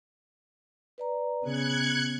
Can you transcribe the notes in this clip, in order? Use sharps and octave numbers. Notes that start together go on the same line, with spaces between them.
B4 D5 A#5
C#3 B3 F#6 G#6 C#7